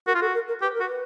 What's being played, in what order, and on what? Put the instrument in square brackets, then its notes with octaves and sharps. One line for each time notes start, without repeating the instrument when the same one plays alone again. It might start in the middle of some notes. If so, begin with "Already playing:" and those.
[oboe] F#4 [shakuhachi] A#4
[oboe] F4
[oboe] F#4 [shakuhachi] A4
[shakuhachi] A#4
A#4
[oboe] G4 [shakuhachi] B4
[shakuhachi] A#4
[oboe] F#4
[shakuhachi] B4